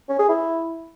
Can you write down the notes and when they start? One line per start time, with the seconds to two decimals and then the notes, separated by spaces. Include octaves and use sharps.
0.09 C#4
0.19 G#4
0.29 E4